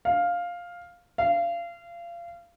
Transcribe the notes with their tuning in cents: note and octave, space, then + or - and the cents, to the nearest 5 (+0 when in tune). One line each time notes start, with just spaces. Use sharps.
F5 +5
F5 -30